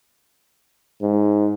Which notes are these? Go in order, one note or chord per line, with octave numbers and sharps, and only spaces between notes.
G#2